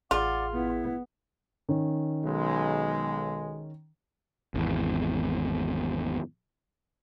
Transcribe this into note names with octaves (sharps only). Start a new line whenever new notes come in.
A1 F4 G#4 D5 F#5 D6
B3 E4
D#3 C#4
B1 G#3
G#1 E2